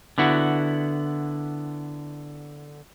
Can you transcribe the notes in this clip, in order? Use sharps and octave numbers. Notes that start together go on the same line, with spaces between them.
D3 B3 E4 F#4